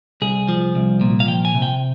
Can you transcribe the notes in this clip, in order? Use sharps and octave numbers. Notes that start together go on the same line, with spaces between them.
C2 G#4
F3
C2
A#2
F5
F3 G5
G#5
C3
G5